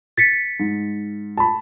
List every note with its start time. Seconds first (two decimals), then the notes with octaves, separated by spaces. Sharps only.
0.18 A6 B6 C#7
0.60 G#2
1.37 A5 B5